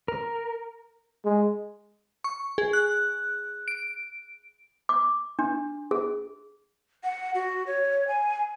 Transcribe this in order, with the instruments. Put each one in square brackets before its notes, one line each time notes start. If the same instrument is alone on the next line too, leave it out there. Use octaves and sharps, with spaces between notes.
[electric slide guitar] A#4
[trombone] G#3
[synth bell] C#6
G#4
F#6
D7
[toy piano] D6
D4
G#4
[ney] F#5
F#4
C#5
G#5